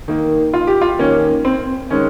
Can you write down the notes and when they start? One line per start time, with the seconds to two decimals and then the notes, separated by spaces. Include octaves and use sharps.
0.08 D#3 A#3
0.54 F4
0.67 G4
0.81 F4
0.99 D#3 A#3 C#4
1.45 C4
1.90 D#3 G#3 C#4